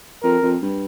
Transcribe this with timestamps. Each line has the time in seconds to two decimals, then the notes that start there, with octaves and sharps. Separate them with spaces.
0.23 F2 A#4
0.42 F2
0.62 G2